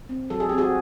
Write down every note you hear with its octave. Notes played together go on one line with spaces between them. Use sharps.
C4
F#3 A4
G#4
C4 G4
F#4 G#4